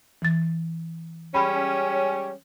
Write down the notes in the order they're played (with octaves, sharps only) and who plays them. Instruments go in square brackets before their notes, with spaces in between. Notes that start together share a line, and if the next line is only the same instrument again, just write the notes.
[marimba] E3 A6
[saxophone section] G3 G#3 C#4 [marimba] B5